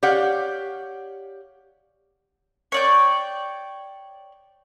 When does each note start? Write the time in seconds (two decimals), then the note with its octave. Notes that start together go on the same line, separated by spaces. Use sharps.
0.03 G4 C#5 D5 F5 F#5
2.72 C#5 D5 G5